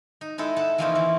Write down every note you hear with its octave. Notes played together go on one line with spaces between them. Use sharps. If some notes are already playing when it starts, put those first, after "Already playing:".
D#4
G#3 D#4 E4 A4
A4 F#5 A5
E3 F3 A#3 C4 C#4 D#4
E3